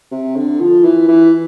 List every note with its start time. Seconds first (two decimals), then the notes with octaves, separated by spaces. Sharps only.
0.11 C3
0.36 D3
0.60 F3
0.84 E3
1.08 E3